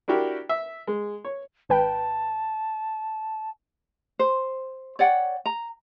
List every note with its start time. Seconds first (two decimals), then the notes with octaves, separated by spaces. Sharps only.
0.08 D4 E4 F#4 G4 A#4
0.49 E5
0.87 G#3
1.25 C#5
1.69 G#1 B4 G5 A5
4.19 C5
4.99 C#5 D5 F#5 G5
5.46 A#5